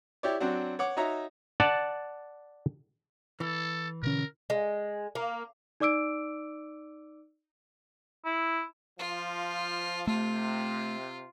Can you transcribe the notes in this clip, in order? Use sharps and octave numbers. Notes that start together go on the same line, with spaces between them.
E4 G4 C#5 D5
F#3 C4 D4 F#4
C#5 F#5 D6
D#4 F#4 C#5 E5 A#5
D5 F#5 A5
E3 A4
B2 D3 C#4 A#4
G#3
A#3
D#4 D5 D6 E6 D7
E4
F3 F4
C3 A3 F4